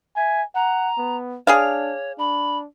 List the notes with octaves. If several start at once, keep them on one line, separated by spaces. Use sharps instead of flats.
E5 G#5
F#5 A#5
B3
D4 G#4 C#5 D5 F5
D4 B5